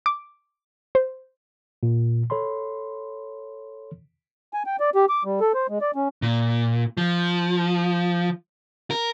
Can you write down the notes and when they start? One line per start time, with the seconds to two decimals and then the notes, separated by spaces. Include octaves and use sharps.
0.06 D6
0.95 C5
1.83 A#2
2.30 A4 C#5 B5 C6
4.54 G#5
4.66 G5
4.80 D5
4.95 G4
5.09 D6
5.25 G3
5.41 A4
5.54 C5
5.69 G#3
5.81 D5
5.96 C#4
6.22 A#2
6.97 F3
8.91 A#4